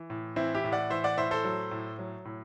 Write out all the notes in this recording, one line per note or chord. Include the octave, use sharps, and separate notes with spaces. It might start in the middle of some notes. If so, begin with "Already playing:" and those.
Already playing: E3
A2
E3 C4 E4
E4 G4
A2
D5 F#5
E3 C5 E5
D5 F#5
A2 C5 E5
A4 C5
F#3
A2
F#3
A2